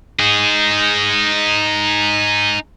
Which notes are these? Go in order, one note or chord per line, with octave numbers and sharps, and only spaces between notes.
D#4 G#4